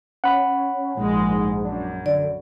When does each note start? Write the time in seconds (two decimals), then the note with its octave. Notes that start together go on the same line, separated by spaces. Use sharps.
0.24 C#4 F#5 B5
0.97 A#1 G#2 G#3
1.65 F#2 D4
2.06 D3 D5